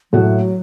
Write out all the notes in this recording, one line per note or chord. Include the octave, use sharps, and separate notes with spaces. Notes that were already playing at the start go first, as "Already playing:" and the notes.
A2 F#3 A3 F#4